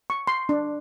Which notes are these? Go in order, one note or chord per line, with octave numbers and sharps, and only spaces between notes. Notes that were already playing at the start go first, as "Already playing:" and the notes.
C#6
C6
D4